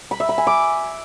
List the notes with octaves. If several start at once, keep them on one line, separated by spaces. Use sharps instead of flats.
B5
E5
B5
G#5
D6